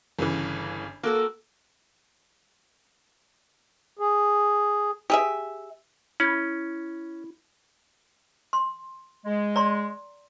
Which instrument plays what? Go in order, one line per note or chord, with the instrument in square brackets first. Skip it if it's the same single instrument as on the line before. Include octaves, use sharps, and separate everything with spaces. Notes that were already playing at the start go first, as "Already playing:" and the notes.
[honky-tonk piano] G1 C#3 E3
[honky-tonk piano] A#3 [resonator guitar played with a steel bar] F#4 A4 A#4
[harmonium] G#4
[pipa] G4 G#4 E5
[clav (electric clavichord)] C#4 [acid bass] E4
[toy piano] C6
[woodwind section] G#3
[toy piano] D5 A#5 C6